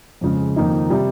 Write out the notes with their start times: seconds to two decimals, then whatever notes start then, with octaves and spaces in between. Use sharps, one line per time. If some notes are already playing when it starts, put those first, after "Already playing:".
0.21 F2 C#3 G#3
0.56 F2 D#3 A#3 D#4
0.90 C3 G3